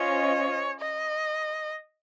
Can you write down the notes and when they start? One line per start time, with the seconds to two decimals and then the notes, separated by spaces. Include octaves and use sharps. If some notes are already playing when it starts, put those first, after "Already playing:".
Already playing: C#4 F4 C5 C#5 D#5
0.81 D#5